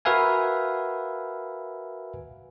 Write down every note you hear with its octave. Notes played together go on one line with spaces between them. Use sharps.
F#4 A#4 B4 E5 F5 G#5